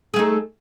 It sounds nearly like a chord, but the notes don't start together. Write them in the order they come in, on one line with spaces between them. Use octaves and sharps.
G#4 A3 D#4